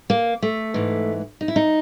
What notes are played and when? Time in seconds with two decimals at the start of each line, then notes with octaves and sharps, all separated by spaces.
0.10 A#3
0.43 A3
0.74 G#2 E3
1.41 D#4
1.48 E4
1.56 D#4